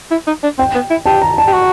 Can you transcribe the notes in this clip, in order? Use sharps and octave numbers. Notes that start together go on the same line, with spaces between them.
E4
D#4
D4
C4 G5
B3
E4
G4 A5
A#5
A5
G4
F#4